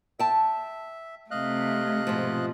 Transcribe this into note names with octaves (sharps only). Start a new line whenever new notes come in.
E5 G5 A5
C3 A3 D#5 F5 F#6
G#2 B2 F3